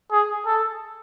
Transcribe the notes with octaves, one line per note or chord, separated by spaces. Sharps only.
G#4
A4